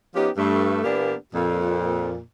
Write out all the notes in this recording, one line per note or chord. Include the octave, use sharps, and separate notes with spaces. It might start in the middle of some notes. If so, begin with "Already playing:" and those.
F3 B3 C#4 D#4 G4
G2 A3
A#2 E3 A#3 B3 D4 G4
F2 A#2